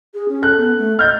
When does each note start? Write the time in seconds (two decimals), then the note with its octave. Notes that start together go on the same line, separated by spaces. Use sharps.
0.14 G#4
0.29 C#4
0.42 A4 F#6
0.57 B3
0.79 A3
0.99 D#5 F6 G6 A6